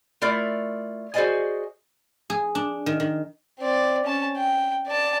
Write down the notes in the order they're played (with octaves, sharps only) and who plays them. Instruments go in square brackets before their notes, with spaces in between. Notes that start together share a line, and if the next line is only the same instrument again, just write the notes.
[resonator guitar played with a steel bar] A3 E4 F4 A#4 D5
F#4 G#4 C5 D5 D#5 G#5
[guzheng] G#4
D4
D#3
D#3
[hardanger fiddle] C4 D5
C#4 A5
G5
D5 A5